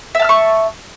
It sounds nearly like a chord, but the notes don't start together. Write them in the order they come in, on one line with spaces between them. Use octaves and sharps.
E5 A5 F6 C#6